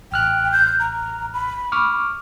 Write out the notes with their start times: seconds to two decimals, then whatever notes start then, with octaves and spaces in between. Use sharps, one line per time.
0.12 A1 G5 F6 F#6
0.52 G6
0.80 A#5
1.33 B5
1.72 C#6 D6 F6